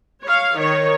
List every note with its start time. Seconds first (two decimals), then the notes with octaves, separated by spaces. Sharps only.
0.23 C#5 F5
0.58 D#3 C#5